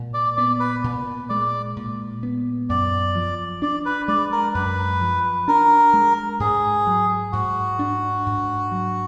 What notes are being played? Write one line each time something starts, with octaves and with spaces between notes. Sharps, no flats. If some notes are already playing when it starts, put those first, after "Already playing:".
Already playing: A#2 G#3
D5
B3 D5
B4
A#2
G#3 D5
A#2
B3
F#2 D5
F3
D4 D5
B4
G#3 D5
A#4
F#2 B4
F3
D4 A#4
G#3
G#2 G#4
F#3
G#2 F#4
D4
G#2
F#3